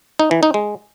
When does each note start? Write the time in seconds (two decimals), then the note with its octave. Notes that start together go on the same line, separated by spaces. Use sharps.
0.19 D#4
0.31 E3
0.43 D#4
0.54 G#3